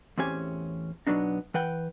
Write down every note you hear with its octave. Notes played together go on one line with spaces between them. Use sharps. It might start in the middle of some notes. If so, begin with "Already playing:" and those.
E2 A2 C4 C#4 G4 G#5
B2 D3 F#3 B3 D4 D#4
E3 B4 F#5 G5